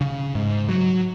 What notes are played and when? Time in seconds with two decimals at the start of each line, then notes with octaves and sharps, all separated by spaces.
0.01 C#3
0.35 G#2
0.69 F#3